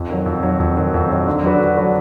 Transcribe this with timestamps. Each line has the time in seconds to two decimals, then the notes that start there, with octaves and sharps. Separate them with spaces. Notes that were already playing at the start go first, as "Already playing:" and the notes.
Already playing: F2
0.10 D#3 F#3
0.26 F2
0.43 D#3 F#3
0.60 F2
0.77 D#3 F#3
0.94 F2
1.10 D#3 F#3
1.26 D3
1.43 F#3 D4 F#4 B4
1.60 D3
1.78 F#3 D4 F#4 B4